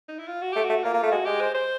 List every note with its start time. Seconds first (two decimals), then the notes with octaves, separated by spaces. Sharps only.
0.09 D#4
0.19 E4
0.27 F4
0.42 F#4
0.53 A3 G4
0.64 F#4
0.69 A3
0.83 A#3 F4
0.94 A#3
1.03 A3
1.12 G#3 F#4
1.26 G#3 G4
1.41 C5
1.55 C5